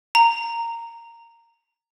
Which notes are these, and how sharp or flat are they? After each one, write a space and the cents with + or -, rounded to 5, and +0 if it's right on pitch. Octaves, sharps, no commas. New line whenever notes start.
A#5 -10